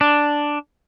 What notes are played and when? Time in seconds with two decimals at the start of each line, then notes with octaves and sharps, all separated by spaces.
0.01 D4